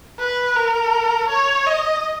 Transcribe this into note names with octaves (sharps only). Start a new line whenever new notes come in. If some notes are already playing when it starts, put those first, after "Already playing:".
B4
A#4
C#5
D#5